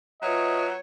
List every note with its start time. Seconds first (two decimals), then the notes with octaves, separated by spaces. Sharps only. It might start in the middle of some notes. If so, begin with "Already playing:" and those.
0.22 F#3 F4 B4 C#5 D#5 E5